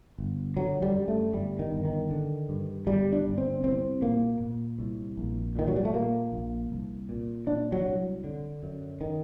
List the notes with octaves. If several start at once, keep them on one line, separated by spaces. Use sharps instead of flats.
G1
D3 F#3
G3
F#2
A3
G1 G3
D#3
G1
D#3
D3
G2
G1 G3
D4
G1
C4
C2 C4
A#2 A#3
A#2
C2
A#1
A#2 D#3
F#3
G3
A3
A#2 A#3
A#1
C2
A#2
A#2 D4
F#3
C2
D3
F#2
D#3